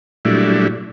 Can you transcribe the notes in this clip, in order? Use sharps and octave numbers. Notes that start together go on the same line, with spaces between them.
A#2 F#3 G3 A3 D4 E4